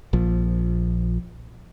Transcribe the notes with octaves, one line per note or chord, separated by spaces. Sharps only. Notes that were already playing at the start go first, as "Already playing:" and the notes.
A#1 F3